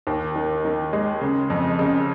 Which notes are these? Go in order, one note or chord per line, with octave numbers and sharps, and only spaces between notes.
D#2
D#3
D#3
G#3
C#3
F2
C#3